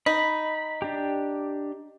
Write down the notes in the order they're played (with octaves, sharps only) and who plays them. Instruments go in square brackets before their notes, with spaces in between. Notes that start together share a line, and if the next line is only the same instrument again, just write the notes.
[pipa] D#4 [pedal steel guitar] B5
[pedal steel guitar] D4 G4